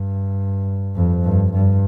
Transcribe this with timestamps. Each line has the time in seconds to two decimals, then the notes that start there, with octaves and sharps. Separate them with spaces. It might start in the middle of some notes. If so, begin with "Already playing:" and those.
Already playing: G2
0.96 F2
1.25 G2
1.53 G2